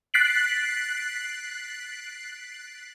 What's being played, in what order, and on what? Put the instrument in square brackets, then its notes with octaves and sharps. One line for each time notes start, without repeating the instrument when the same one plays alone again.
[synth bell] F#6 A6 B6 C7 D7 F#7